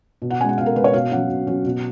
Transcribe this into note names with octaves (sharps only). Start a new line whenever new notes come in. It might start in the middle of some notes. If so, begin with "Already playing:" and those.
B2
F#5
G#3 C#4 G#5
F#5
B2 F5
A#4
G#3 C#4 B4
C#5
B2 F5
F#3 C#4 F#5
B2
F#3 C#4
B2